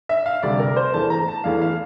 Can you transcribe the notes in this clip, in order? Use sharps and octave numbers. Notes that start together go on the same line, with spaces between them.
E5
F5
D2 C3 G3 D5
A#4
C5
E2 E3 A3 A5
A#5
A5
E2 E3 A3 F5
F5